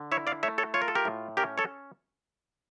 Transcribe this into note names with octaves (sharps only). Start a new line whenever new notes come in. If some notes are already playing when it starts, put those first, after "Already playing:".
Already playing: D3
E4 C#5 E5
D5 F5
A3 C#5 E5
A4 C#5
F4 C#5
A#4
A4
G4 A#4
A2
C#4 G4 A#4
A4 C#5